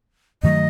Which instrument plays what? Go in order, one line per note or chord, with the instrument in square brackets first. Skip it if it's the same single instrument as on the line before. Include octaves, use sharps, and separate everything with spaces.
[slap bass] G2 D#3 F#3 A3 [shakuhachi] D#5